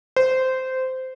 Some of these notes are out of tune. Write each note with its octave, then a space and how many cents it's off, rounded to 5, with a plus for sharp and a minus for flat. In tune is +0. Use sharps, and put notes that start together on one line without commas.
C5 -15